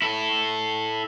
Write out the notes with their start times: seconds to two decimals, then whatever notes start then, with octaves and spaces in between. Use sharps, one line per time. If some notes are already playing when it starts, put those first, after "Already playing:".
0.02 E4 A4